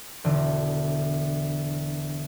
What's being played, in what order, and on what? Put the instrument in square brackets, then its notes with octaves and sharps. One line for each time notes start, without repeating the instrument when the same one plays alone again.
[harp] E1 D3